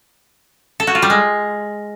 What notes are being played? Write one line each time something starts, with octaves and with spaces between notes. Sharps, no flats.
A4
F#4
F4
G3
G#3